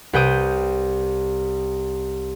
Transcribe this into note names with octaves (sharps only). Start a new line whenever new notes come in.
C2 B4 G5 D#6